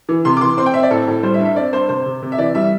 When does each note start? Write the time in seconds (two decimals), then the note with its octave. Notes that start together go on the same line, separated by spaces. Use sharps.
0.09 E3
0.25 C3 C6
0.37 D6
0.41 E3 C6
0.58 C4 C6
0.66 G5
0.74 C4 E5
0.83 D5
0.91 A2 A4
1.08 A2
1.23 G3 C5
1.34 E5
1.40 G2
1.46 E5
1.56 C4 D5
1.73 G2 C5
1.89 C3 C5
2.06 C3
2.22 C3
2.32 E5
2.38 E3 D5
2.55 G3 E5